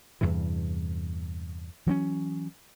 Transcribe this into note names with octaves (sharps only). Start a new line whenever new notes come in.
E2 G2 C3 E3
E3 F#3 C4 C#4